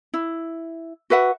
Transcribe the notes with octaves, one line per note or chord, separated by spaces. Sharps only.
E4
F#4 B4 E5 F#5